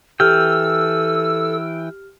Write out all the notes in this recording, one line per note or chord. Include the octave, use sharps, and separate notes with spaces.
E3 G4 A4 G5 E6 F6